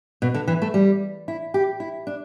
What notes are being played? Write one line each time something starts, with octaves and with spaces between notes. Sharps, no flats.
B2
D3
E3
A3
G3
E4
G4
E4
D4